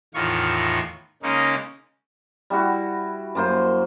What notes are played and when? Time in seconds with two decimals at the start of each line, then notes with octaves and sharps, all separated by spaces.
0.14 E2 A2 D#3 F4 C#6
1.23 C#3 G#3 A#3 C#4 D#4
2.50 G3 E4 F#4
3.35 F#2 A#3 C5